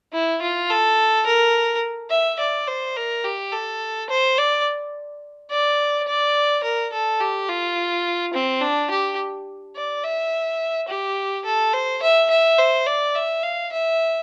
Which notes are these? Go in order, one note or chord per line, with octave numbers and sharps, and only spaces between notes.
E4
F4
A4
A#4
E5
D5
C5
A#4
G4
A4
C5
D5
D5
D5
A#4
A4
G4
F4
C4
D4
G4
D5
E5
G4
A4
C5
E5
E5
C5
D5
E5
F5
E5